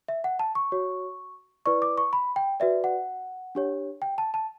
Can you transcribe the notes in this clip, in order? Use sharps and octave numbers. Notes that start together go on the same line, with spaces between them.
E5
F#5
A5
C#6
F#4 C#5
E4 B4 D5 C#6
D6
C#6
B5
G5
F#4 B4 D5 E5
F#5
D4 G4 C#5
G5
A5
A5